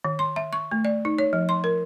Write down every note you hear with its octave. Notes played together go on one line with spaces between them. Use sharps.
D#3
C6
E5
C#6
A3
D5
D#4
C#5
F3
C6
A#4